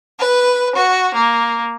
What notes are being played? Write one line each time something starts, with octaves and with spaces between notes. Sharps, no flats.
B4
F#4
A#3